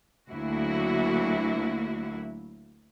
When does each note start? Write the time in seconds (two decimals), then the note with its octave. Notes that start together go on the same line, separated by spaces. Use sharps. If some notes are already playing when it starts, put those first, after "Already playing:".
0.30 D2 F#3 A#3 E4 F#4